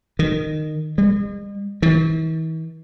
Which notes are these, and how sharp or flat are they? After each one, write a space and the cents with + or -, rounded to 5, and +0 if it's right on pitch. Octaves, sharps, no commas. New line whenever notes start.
D#3 -15
G#3 -45
E3 -45